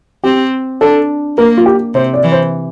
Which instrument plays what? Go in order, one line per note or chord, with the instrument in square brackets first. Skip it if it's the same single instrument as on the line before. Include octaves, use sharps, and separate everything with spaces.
[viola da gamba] C4 [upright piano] G4
[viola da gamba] D4 [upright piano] A4
[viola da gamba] A#3 [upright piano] A#4
[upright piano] F4
G4
[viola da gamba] C3 [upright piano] C5
[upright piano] D5
[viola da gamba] E3
[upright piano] C5